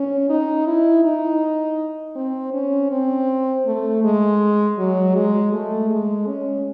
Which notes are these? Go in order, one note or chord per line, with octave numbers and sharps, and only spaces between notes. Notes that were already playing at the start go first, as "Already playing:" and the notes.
Already playing: C#4
D#4
E4
D#4
C4
C#4
C4
A3
G#3
F#3
G#3
A3
G#3
C#4